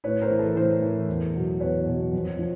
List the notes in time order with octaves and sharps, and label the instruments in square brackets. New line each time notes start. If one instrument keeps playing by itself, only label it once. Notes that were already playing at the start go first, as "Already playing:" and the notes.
[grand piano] A2 B4 C#5
A#4 C5
E3
A4 B4
A2 A#4 C5
E3
E2
B2 F#3
E2 B4 C#5
B2 F#3
F2
F3